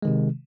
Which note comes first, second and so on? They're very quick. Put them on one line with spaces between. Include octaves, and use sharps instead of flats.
G#3 D#3 C3